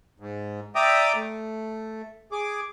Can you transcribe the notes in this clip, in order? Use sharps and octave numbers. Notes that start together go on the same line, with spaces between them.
G#2
D5 E5 G5 A#5 D6 D#6
A3
G#4 D6